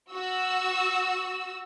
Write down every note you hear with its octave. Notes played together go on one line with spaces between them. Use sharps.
F#4 E6